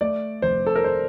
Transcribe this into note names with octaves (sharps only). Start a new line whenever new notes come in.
A3 D5
F1 C5
A4
A#4
C5